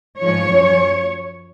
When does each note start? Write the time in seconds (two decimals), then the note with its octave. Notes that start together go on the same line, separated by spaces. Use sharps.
0.19 G#2 F3 C#5
0.49 F#2 F3